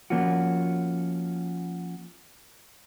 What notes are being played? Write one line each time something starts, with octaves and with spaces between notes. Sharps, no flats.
F3 A#3 C#4 F4 F#4